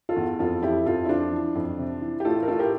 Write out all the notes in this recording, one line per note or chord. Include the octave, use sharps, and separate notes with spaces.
F4 A4
E2
F2 F4 A4
F2 E4 G4
F2 F4 A4
E4
F3 D4 F4
E3
F2
C3
E3
G4
A2 F4 A4
A#4
A2 F4 A4
G4 A#4